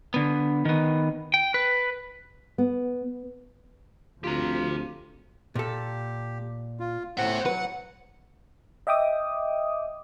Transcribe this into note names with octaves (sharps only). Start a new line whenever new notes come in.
D3 B3
D#3 B3
G5
B4
B3
D2 F3 C4 F4 G4 A#5
A#2 G4 A4
F4
A2 C5 E5 F#5
F#3 B4 F#5
D#5 E5 G5 D6 D#6